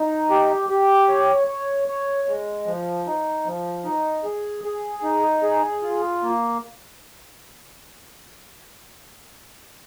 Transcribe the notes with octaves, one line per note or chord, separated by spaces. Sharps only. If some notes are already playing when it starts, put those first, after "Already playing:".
Already playing: D#4
G4
G4
C#5
C#5
C#5
G#3
F3
D#4
F3
D#4
G#4
G#4
D#4
G#4
F4
A#3